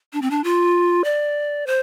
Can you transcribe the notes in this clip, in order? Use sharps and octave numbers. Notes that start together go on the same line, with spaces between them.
D4
C4
D4
F4
D5
C5